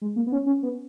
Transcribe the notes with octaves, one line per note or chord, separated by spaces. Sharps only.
G#3
A#3
B3
C#4
C#4
B3